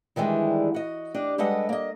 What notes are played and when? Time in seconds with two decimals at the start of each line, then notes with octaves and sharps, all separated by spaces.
0.16 D#3 E3 G3 G#3 D4
0.74 F#4 D#5
1.14 D4 G4 D#5
1.38 G3 G#3 A4 B4 D#5 F#5
1.69 A#3 D#5